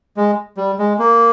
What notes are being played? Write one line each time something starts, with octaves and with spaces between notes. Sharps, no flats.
G#3
G3
G#3
A#3